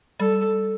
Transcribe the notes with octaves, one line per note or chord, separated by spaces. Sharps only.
G3 A4